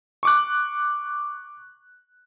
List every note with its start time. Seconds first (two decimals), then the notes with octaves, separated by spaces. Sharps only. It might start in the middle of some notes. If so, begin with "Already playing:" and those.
0.23 C#6 D6 F#6